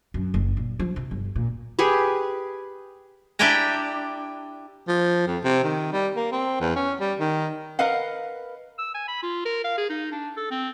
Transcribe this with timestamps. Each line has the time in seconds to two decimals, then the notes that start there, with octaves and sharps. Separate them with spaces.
0.14 F#2
0.34 F#1
0.57 A#2
0.79 F3
0.96 C3
1.11 G1
1.36 A#2
1.79 G4 G#4 B4
3.39 D4 E4 G4 G5 G#5 A#5
4.88 F3
5.27 F2
5.44 C3
5.64 D#3
5.93 G3
6.16 A#3
6.32 C4
6.60 E2
6.76 C#4
7.00 G3
7.19 D#3
7.79 A#4 B4 D#5 F5 F#5
8.79 E6
8.95 G#5
9.08 B5
9.23 F4
9.46 A#4
9.64 F5
9.78 G#4
9.90 D#4
10.12 D4
10.37 A4
10.51 C4